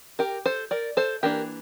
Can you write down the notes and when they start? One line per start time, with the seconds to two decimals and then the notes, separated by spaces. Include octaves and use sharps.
0.19 G4 A#4
0.46 A4 C5
0.71 A#4 D5
0.97 A4 C5
1.23 E3 A#3 D4 G4 A#4